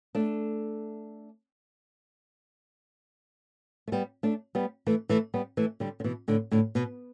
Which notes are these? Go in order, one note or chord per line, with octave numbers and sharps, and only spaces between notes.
A3 D4
A3
G3 B3
A3 D4
G3 B3
E3 A3
E3 A3
G3 B3
E3 A3
D3 G3
D3
B2 E3
A2 D3
A2 D3
B2